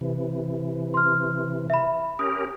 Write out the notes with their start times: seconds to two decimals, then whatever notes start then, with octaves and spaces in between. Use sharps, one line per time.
0.01 C3 E3
0.94 C6 F6
1.70 E5 B5
2.19 C#4 G4 A#4 D#6